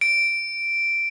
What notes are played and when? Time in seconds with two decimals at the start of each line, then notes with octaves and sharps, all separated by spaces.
0.01 D7